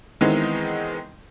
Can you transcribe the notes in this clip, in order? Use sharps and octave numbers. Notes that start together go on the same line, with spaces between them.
D#3 E3 G#3 B3 C4 D#4